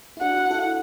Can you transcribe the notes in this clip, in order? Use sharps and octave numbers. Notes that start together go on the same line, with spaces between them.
E4
D4 F#4 F#5
E4
E4 A4